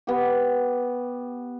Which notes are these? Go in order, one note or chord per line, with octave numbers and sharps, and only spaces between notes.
B3 G4